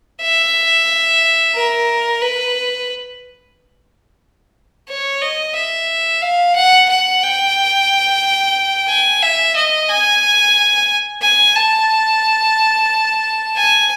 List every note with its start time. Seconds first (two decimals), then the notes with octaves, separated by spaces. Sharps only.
0.22 E5
1.55 A#4
2.22 B4
4.89 C#5
5.22 D#5
5.55 E5
6.22 F5
6.56 F#5
6.89 F#5
7.23 G5
8.89 G#5
9.23 E5
9.56 D#5
9.89 G#5
11.22 G#5
11.56 A5
13.57 G#5